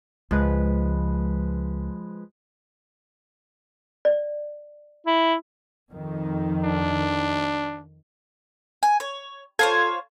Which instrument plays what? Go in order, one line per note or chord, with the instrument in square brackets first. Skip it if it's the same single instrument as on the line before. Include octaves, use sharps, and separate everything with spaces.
[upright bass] C#2 [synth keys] F3 G#3 B4
[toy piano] D5
[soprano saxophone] E4
[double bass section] F2 D#3
[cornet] D4
[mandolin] G#5
C#5
[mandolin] F4 C5 C#5 [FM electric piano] A4 G#6